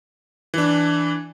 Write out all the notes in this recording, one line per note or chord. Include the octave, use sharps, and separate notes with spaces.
E3 D4